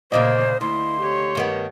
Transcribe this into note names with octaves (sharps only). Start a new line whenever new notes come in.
D2 A#2 C#3 A#3 C5 D5 D#5 F5
D2 E4 C6
G4 C#5
G2 D#3 B3